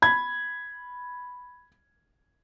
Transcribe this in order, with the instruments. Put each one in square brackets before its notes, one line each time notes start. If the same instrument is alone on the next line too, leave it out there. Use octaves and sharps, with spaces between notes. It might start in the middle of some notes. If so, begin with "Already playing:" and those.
[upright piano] B5 G#6